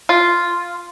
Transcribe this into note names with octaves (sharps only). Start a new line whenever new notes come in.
F4